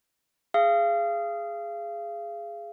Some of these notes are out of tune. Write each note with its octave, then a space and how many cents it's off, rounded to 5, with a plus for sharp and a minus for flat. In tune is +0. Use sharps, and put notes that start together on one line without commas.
G#4 +0 F5 -30